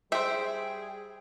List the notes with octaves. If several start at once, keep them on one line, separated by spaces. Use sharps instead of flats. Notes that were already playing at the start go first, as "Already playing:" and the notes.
G3 G#4 C5 E5 G5